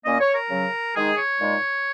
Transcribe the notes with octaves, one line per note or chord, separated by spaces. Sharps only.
A#2 A#3 C#4 D#5
C#5
A#4
C#3 F#3 C#4
D#3 G#3 D#4 G#4
C#5
A#2 G#3 D#4